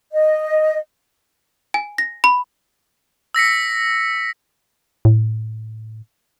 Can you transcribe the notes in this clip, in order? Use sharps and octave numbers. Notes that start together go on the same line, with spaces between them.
D#5
G#5
A#6
B5
E6 A#6 B6 C#7
A2